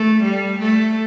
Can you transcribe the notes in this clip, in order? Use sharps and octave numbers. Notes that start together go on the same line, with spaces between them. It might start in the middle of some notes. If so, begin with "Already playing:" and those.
Already playing: A3
G3
A3